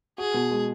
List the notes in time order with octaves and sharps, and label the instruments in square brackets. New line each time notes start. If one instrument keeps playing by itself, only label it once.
[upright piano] F#4 [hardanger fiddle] G#4
[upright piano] B2
G#3